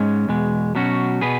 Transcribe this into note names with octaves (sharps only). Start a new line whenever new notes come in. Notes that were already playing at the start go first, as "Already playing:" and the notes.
Already playing: G#2 G#3 C#4
E2 B2 G#3
B2 F#3 C#4 F#4
B2 B3 G#4 B4